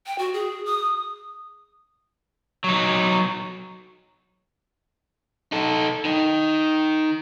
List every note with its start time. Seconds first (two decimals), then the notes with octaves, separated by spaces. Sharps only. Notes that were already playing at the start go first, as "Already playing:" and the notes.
0.06 G5
0.19 F#4
0.33 G#4
0.66 D#6
2.64 F#3 D#4
5.52 D#4 A4
6.05 D#3 D#4